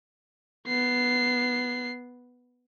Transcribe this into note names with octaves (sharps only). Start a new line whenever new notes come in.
B3 C7